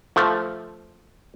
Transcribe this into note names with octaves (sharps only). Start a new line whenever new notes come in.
F3 A3